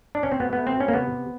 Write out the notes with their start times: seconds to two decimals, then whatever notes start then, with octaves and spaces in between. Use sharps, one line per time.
0.15 D4
0.23 C#4
0.32 C4
0.40 B2 B3
0.53 A3 B3
0.67 C4
0.76 B2 C#4
0.88 A#3
0.93 C3 B3
1.12 C3